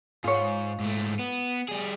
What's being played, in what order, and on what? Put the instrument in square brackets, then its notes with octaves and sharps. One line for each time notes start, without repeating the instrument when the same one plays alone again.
[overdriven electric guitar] G#2 [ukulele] F4 C#5
[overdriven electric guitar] G#2 A3
B3
G3 G#4